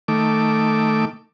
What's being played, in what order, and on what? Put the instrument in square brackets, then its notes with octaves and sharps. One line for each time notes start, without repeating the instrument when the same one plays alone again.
[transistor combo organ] D#3 A3 D6